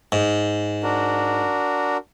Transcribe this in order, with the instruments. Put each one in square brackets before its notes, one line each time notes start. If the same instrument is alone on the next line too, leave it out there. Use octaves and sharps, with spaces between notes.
[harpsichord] G#2
[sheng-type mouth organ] D4 F#4 A#4